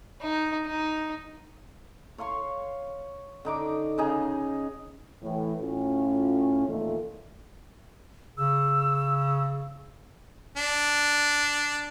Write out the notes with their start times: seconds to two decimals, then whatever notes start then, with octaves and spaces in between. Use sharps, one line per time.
0.21 D#4
0.66 D#4
2.18 C#5 F5 C6 C#6
3.45 D3 D#4 D6
3.98 C#3 D#4 G#4
5.22 A2 E3
5.61 A2 C#4 F4
6.67 E2 A#2 D#3 A3
8.38 C#3 E6
10.57 D4